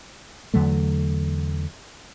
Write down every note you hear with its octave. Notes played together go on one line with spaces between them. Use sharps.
E2 D3 F#3 A3